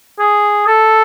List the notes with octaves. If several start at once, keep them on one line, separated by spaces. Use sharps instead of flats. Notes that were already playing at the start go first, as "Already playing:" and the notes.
G#4
A4